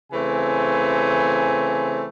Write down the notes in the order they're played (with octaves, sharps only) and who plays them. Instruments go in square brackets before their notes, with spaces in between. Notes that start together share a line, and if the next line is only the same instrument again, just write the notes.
[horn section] C#3 E3 A3 C4 G#5